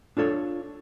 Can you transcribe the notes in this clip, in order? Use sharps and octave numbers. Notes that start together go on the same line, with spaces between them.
D4 F4 A4 C#5